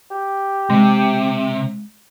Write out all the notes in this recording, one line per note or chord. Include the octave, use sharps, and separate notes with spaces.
G4
C3 G#3